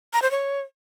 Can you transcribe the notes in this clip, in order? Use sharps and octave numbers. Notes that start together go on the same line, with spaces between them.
A#5
C5
C#5